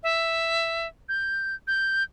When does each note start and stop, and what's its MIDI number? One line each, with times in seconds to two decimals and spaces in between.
0.03 0.87 76
1.09 1.55 91
1.67 2.03 91